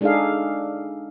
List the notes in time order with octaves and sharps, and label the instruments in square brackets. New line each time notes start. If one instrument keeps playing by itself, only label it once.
[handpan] G#3 D4 D#4 G#4 A4 F5